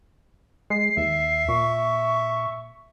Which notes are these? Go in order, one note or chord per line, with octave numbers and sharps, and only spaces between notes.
G#3 C7
D#2 E5
A#2 C#6